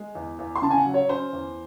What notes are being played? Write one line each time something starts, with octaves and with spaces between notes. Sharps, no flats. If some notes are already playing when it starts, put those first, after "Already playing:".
Already playing: G#3
E2
E2
C6
C#3 A5
G#5
F#5
F#3
C#5
C#4 C5
E2